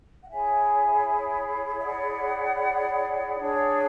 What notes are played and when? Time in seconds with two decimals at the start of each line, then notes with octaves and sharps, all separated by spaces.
0.23 F#5
0.29 E4 G#4 C#5 E5 G#5
1.79 E5
1.83 D5 F#5
3.38 D4 G#4 C#5